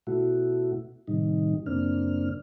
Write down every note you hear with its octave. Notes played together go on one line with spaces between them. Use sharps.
B2 A3 E4 F#4
A2 C3 D#3 G3 D#4
F#2 C#3 A#3 C4 D4 F6